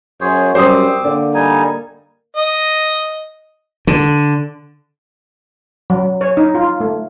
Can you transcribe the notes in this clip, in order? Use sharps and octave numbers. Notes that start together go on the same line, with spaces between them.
F#2 G#4 C5 C#5
F#2 G3 C4 C5 D6 D#6
D3 A#3 D5
G3 D#4 G#5
D#5
D3
F#3
C#5
D#4
F4
A3